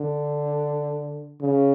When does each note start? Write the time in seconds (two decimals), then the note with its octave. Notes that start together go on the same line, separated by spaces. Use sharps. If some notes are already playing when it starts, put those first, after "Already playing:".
Already playing: D3
1.42 C#3